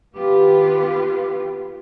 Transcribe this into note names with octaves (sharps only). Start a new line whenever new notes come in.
D#3 B3 F4 G4 B4